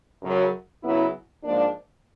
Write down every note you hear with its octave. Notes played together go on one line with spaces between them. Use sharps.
F#2 C#3 F#3
C#3 F#3 B3 E4
G#2 F3 A#3 D4